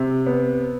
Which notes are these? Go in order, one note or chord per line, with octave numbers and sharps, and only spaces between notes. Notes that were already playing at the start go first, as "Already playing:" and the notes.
Already playing: C3
B3